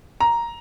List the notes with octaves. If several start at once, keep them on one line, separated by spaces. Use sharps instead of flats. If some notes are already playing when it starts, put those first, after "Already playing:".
A#5